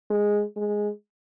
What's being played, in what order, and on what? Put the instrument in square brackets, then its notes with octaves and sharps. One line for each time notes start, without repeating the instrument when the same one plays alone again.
[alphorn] G#3
G#3